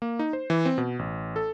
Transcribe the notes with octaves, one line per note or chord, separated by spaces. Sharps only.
A#3
D#4
C5
E3
C4
B2
A1
A4